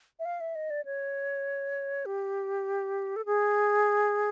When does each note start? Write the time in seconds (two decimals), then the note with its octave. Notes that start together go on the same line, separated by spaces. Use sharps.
0.19 E5
0.25 F5
0.40 E5
0.55 D#5
0.70 D5
0.85 C#5
2.06 G4
3.16 A4
3.26 G#4